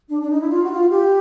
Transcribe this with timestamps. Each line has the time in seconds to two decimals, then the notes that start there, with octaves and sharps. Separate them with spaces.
0.08 D4
0.20 D4
0.29 D#4
0.40 E4
0.49 F4
0.64 F#4
0.71 F4
0.91 G4